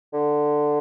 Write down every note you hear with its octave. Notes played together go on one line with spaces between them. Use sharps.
D3